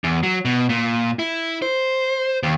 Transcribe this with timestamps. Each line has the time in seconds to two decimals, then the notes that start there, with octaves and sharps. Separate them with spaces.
0.04 E2
0.23 F#3
0.45 B2
0.69 A#2
1.19 E4
1.62 C5
2.43 D#2